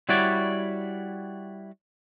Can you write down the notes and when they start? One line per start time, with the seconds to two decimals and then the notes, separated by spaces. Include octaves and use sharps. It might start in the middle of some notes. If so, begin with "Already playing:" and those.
0.09 G3 E4 F#4 C#5 D5